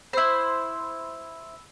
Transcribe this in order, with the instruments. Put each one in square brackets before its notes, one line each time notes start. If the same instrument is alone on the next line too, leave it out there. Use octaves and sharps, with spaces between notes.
[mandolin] E4 C5 [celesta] B5 E6